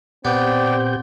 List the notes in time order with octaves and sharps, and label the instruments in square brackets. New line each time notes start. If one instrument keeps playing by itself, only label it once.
[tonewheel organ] A#2 G4 G6 [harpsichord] B3 [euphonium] C4 [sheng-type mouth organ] D5 G5